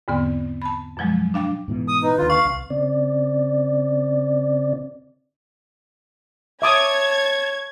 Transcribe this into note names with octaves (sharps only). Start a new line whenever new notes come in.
E2 G#2 D3 B3 C4
A5 B5
F#2 B2 F3 F#3 G#3
D4 F5 G5 D6
G#2 B2 E3
D#6
D#4 B4
D#2 D3 F4
F5 C#6
C2
C#3 C4 D5
C#5 E5 A5 D6 D#6 G#6